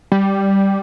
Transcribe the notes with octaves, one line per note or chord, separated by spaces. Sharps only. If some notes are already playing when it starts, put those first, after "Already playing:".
G3